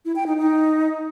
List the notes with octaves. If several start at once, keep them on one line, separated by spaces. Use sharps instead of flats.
E4
G5
D#4
D#4